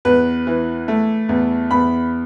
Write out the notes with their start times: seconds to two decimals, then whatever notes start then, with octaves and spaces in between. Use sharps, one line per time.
0.05 E2 B4
0.47 E3
0.88 A3
1.29 E2
1.71 E2 B5